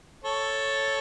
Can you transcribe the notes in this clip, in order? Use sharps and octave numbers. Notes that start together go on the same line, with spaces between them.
A4 C#5